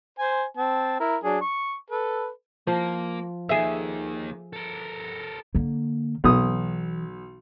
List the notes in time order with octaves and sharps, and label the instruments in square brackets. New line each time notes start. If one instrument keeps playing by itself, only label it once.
[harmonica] C5 G#5
C4 A5
E4 A#4
F#3 D4 G#4
C#6
A4 B4
[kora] F3 [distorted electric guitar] A#3
[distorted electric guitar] D#2 D#3 [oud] G#4 E5
[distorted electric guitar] A4 A#4
[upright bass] D3 A#3
[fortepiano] B1 D#6 [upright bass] E3